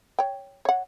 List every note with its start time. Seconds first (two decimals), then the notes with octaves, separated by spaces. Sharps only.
0.19 C#5 G5
0.65 C#5 F#5